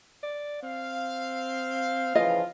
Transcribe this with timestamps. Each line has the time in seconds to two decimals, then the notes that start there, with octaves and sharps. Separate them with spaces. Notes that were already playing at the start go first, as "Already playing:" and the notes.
0.23 D5
0.63 C4 F5
2.15 C#3 E3 F3 F4 D#5